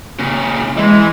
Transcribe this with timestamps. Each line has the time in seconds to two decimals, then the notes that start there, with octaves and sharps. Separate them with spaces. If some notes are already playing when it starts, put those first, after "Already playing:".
0.19 A#2 C#3
0.77 E3 G#3